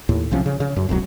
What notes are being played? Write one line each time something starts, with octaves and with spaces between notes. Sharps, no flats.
D#2 A2
B1 C3 F3 C#4
C#3
C#3
F#2
E1 C2 B2 F#3